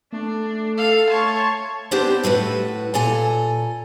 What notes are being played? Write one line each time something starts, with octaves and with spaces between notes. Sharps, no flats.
A3 D4
A4 F5
C#5 A5 C6
B3 C4 D4 G4 C5
A2 F#4 B4 E5
A#2 A4 G#5 A#5